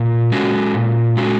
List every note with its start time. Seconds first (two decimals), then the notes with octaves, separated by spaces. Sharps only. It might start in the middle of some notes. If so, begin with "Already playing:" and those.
Already playing: A#2
0.32 G#3 C#4 F#4
0.74 A#2
1.17 G#3 C#4 F#4